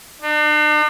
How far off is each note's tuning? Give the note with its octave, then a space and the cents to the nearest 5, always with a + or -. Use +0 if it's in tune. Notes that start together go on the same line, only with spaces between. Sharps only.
D4 +45